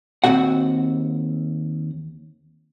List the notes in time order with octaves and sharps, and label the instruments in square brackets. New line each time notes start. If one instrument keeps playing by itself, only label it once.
[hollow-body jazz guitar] D#2 G#2 C4 F#4 F#5